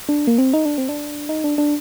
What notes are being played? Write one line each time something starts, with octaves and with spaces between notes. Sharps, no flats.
D4
A#3
C4
D#4
D4
C4
D4
D#4
D4
D4